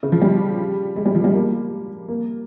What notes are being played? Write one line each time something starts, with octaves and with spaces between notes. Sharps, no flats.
C#3
F3
G3
G#3
G3
F3
G3
A#3
A#3